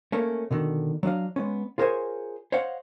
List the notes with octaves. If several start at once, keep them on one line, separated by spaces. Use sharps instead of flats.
A3 A#3 C#4
B2 D3 D#3
F#3 D4 D#5 F5
G#3 B3 C#4
F4 G#4 A#4 C5 C#5 G#5
C5 C#5 D#5 F5 F#5